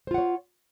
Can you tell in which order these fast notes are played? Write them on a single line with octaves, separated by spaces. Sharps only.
C5 F4 F#5 C#5